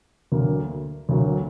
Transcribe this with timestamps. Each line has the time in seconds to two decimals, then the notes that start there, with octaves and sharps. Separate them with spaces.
0.32 D2 D3 F#3 A#3
1.09 D2 D3 F#3 A#3